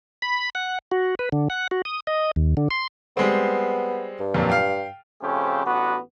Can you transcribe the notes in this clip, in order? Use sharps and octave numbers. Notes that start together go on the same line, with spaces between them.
B5
F#5
F#4
B4
D3
F#5
F#4
D#6
D#5
D#2
D3
C6
G3 G#3 B3 C4
G2
F2 A#2 F#3
F5 G5
F2 C#3 A3 C#4 G4 C5
A1 B3 D4 F#4